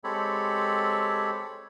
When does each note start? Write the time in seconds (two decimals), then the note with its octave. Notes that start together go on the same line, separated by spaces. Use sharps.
0.04 G#3 C4 G4 A4 C#5 B5